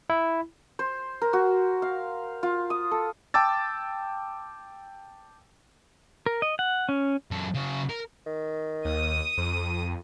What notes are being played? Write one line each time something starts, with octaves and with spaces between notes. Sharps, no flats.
E4
C5
A#4
F#4
F5
F4
D#6
A4
G5 A5 D6 E6 A6
A#4
D#5
F#5
C#4
F#2 A4
C#3 F#4
A#4
D#3
D#2 D#6 D#7
F2